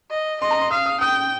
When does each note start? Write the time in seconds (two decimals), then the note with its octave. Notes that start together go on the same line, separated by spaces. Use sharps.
0.11 D#5
0.41 D#5 C6
0.51 A#5
0.61 C6
0.71 F5 D#6
0.86 D#6
1.00 G5 D#6